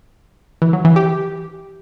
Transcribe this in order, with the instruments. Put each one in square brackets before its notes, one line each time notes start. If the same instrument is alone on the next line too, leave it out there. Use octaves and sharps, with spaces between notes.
[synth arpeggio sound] E3
F#3
E3
G4